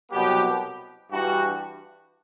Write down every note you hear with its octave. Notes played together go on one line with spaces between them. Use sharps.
C2 B2 F#3 B3 G4
G2 E3 G3 F#4